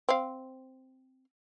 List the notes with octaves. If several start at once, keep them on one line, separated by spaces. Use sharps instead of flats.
C4 F5